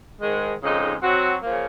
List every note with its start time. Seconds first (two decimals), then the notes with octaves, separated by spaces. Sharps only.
0.21 G#2 D#3 G#3
0.62 F2 C#3 G#3 D#4 A#4
1.03 F#3 C4 F#4
1.43 C#3 F3 A#3